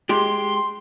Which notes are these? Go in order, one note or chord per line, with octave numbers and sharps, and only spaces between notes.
G#3 G4 C6